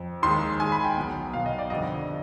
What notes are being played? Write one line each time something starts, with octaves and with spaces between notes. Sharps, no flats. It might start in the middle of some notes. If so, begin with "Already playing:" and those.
Already playing: F2
D#2 D#3 G#3 C6
D#2 D#3 G#3 G#5
B5
G5
B1 B2 B3
B1 B2 B3 F5
D#5
D5
G1 F2 D3 G3 D#5